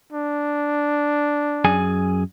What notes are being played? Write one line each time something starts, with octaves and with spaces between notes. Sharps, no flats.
D4
F#2 G#4 G#5